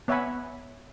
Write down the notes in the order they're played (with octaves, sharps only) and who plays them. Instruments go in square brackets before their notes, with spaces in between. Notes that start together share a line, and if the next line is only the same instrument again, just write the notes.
[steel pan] B3 C#5 E5 F#5 G#5 B5